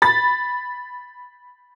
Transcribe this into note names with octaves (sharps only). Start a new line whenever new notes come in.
B5 A6